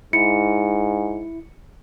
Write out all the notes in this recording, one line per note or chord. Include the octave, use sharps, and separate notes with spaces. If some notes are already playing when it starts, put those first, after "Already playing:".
G#2 E4 C#7